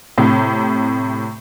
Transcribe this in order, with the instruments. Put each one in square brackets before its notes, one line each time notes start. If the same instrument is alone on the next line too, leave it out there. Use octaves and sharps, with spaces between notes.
[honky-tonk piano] A2 C3